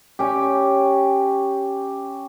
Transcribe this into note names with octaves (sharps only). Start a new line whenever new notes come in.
C#4 G4